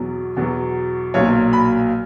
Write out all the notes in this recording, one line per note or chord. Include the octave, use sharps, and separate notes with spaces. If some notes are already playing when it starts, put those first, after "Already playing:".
Already playing: E2 B2 F#3
E2 B2 F#3
B1 A#2 F#3 C#5
B5